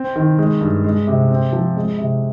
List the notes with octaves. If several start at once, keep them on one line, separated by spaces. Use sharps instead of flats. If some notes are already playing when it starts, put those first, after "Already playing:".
Already playing: C4
D#3
G#3
G2
G#3
C3
C4
F3
G#3
C3